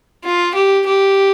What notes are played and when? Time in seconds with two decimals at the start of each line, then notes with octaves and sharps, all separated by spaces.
0.25 F4
0.54 G4
0.86 G4